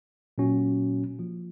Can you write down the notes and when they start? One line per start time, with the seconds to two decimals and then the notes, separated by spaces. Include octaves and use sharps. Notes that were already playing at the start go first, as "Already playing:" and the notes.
0.38 A#2 F#3 C#4 F#4
1.19 F3 A#3 F4